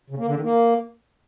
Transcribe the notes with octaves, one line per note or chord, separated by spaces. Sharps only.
C#3
A#3
D3
D#3
A#3